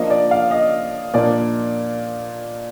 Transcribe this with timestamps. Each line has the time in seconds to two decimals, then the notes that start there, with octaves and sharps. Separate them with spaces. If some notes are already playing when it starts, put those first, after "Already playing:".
Already playing: F3 A#3 D4 D#5
0.10 D5
0.31 F5
0.51 D#5
1.14 A#2 F3 A#3 D4 D5